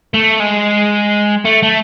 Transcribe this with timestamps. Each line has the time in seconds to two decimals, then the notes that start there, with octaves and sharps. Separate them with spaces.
0.14 A3
0.40 G#3
1.45 A3
1.63 A3